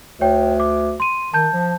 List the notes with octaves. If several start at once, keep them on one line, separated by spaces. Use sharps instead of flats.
D2 C#5 G5
D6
C6 D#7
D#3 A5 G6
F3